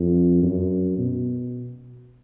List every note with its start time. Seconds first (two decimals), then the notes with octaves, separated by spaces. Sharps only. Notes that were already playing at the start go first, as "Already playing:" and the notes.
Already playing: F2
0.43 F#2
0.98 B2